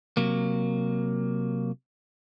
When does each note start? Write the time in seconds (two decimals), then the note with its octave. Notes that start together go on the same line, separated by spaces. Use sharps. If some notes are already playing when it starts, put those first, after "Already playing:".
0.17 C3 F#3 A#3